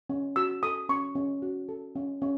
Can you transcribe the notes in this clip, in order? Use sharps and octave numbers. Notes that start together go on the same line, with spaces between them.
C#4
F#4 E6
A4 D#6
C#4 C#6
C#4
F#4
A4
C#4
C#4